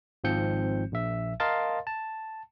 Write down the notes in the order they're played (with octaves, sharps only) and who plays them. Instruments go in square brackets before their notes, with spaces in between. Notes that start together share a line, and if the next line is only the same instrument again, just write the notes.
[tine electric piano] G#1 G#2 F3 C4 G6 C#7
A#1 E5
A#4 D#5 F5 A5 C6 A6
A5